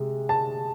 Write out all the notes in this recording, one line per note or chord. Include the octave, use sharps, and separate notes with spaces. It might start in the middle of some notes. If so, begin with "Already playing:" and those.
Already playing: C3 G#3
A5